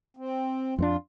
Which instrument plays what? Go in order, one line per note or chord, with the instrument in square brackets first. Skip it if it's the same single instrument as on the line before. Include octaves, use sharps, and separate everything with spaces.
[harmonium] C4
[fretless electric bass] F2 B3 D4 [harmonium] F4